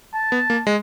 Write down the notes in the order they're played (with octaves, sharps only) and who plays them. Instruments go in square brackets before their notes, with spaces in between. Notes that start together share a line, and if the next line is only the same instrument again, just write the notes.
[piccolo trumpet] A5
[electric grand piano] B3
A#3
G#3